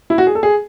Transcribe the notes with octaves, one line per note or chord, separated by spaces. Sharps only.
E4
F#4
G#4
A4
G#4